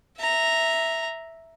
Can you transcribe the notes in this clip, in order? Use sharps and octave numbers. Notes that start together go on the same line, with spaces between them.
E5 A#5